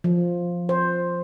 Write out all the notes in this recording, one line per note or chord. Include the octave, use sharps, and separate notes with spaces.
F3
C5